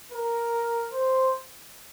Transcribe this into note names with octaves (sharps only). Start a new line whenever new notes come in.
A#4
C5